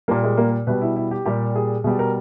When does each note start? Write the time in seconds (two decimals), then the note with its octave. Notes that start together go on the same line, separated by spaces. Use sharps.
0.08 A#2 G3 A#3
0.24 G#3
0.37 A#3
0.67 B2 G3 B4
0.81 E4
0.96 E4
1.11 G4
1.25 A#2 G3 G4
1.56 G#4
1.84 B2 G3 G#4
1.99 A#4